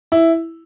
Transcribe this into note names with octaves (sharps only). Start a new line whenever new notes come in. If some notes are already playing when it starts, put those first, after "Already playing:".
E4